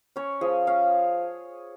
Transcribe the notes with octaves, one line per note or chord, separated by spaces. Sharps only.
C#4 C#5
F3 G#4
C#4 F5